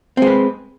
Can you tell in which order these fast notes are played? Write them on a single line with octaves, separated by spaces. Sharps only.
C4 G#3 B4